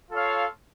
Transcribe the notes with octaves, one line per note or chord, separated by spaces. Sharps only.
F4 A4 C#5 F5